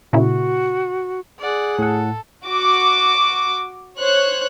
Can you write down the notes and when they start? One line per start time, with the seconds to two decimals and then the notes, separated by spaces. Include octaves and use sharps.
0.13 A#2 C#3 E4 F#4
1.39 G#4 D5 F#5
1.79 A2 A4 F#5
2.47 F#4 D6
3.99 C5 C#5 F#6